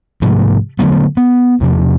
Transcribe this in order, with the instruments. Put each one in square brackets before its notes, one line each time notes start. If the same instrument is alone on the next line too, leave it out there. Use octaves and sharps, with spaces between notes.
[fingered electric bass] G#2 C3 F3 A3
D3 F#3 A3 B3
B3
E2 C3 F3